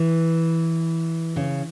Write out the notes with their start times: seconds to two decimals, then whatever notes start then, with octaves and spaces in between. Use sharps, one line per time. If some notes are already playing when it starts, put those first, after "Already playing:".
Already playing: E3
1.36 C#3